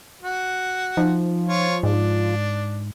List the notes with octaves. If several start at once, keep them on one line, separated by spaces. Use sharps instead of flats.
F#4
F3 D#4
F4 C#5
G#2 D4